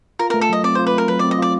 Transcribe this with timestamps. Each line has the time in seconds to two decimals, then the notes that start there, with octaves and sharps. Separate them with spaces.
0.19 F4 A#4
0.30 A3 A#4
0.41 A4
0.49 F#3 D#5
0.64 C4 D5
0.75 F4 C5
0.87 B4
0.94 A3 A#4
1.08 F#3 B4
1.19 C4 D5
1.31 D#5
1.39 F4 D5